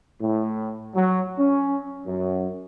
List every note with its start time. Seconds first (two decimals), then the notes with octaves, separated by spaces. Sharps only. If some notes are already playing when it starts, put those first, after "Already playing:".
0.21 A2
0.95 F#3
1.38 C#4
2.06 F#2